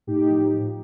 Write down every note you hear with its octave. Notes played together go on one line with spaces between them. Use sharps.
A2 D#4 G4
F3
F3